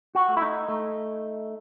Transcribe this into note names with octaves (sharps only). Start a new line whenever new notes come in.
F#4
A3
E4
D#4
A3